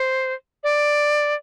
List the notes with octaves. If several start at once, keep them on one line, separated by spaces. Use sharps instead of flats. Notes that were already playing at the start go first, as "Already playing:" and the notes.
Already playing: C5
D5